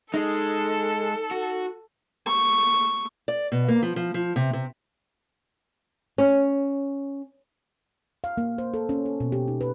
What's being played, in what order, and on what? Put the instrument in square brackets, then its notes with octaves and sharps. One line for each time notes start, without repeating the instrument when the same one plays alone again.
[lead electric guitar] G#3 [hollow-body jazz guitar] D#4 D#5 [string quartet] A4
[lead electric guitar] F#4
[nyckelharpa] C#6
[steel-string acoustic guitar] D5
B2
A#3
F3
F3
F3
C3
C3
[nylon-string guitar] C#4
[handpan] F5
A#3
C5
A4
C#4
A4
B2
G4
D#4
B4